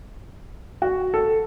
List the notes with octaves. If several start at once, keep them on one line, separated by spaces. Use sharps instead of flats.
F#4
A4